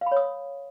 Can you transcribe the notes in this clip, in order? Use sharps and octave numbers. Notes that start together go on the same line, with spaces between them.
F5
B5
C#5
D#6